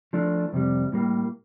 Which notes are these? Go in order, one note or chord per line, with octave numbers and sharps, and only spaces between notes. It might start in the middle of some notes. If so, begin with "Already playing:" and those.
F3 A3 D4
F2 C3 G3
A2 G3 A#3